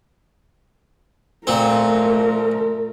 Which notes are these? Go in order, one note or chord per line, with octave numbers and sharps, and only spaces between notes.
A#2 A3 C4 A#4